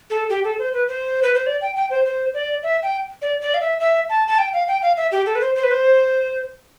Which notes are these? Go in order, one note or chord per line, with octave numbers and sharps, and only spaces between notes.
A4
G4
A4
C5
B4
C5
B4
C5
D5
G5
G5
C5
C5
D5
E5
G5
D5
D5
F5
E5
E5
A5
A5
G5
F5
G5
F5
E5
G4
A4
B4
C5
C5
B4
C5